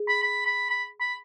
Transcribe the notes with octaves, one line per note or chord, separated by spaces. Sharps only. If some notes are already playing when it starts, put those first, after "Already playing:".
Already playing: G#4
B5
B5
B5
B5
B5